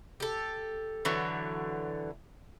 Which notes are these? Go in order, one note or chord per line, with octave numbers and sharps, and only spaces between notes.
G4 A4
D3 E3 F#3 C#5